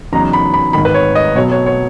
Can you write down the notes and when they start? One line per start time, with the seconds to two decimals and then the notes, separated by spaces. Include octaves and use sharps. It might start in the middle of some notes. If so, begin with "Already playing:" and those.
0.12 E2 C#3 F#3 B3 D#4 A#5
0.33 B5
0.54 B5
0.73 G#1 G#2 D#3 B5
0.85 B4
0.94 C#5
1.15 D#5
1.35 B1 B2 F#3 B3 C#5
1.51 C#5
1.66 C#5